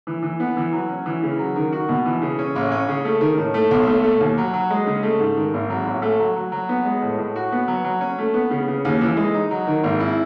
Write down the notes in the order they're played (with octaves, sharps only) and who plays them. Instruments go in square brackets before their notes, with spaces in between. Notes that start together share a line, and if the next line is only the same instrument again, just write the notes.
[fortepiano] E3
E3
B3
E3
F#3
C#4
E3
C#3
F#3
D#3
F#4
B2
E3
C#3
C#4
A1
C#4
C#3
A3
D#3
A2
A3
B1
A3
A3
D#2
F#3
F#3
G#3
C#3
A3
G#2
D#3
G#1
F#3
A1
A3
F#3
F#3
F#3
B3
G#3
A2
A2
F#4
B3
F#3
F#3
C#4
A3
B3
C#3
C#3
D#2
E3
G#3
D#4
F#3
D#3
G#1
E4